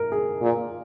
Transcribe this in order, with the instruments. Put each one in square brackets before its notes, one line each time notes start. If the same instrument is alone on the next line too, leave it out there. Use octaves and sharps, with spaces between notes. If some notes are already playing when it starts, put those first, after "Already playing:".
Already playing: [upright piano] A#4
G#4
[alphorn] A#2